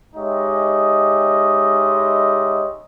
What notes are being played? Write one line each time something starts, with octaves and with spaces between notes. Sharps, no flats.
G#3 D#4 G4 C#5 D#5 E5